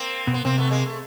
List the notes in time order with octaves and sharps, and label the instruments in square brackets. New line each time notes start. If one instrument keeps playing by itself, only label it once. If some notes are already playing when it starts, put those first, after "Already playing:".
Already playing: [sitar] A#3 C4
[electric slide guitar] B2
[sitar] B3
[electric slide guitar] C3 [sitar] A#3 C4
[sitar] A3 B3
G#3 A#3
A3